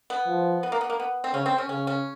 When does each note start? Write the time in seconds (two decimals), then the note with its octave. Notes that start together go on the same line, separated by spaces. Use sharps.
0.10 B3
0.28 F3
0.63 B3
0.72 A#3
0.81 B3
0.90 A#3
1.00 B3
1.24 C4
1.34 C#3 C#4
1.46 C4
1.58 C#4
1.69 C#3 C#4
1.87 C#4